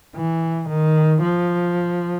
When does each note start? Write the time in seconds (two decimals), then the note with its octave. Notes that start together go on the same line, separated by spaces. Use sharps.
0.16 E3
0.69 D#3
1.22 F3